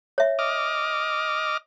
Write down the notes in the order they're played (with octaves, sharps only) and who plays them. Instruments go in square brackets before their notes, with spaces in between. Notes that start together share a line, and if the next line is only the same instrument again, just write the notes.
[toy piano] C#5 E5
[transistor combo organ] D#5 D6 F6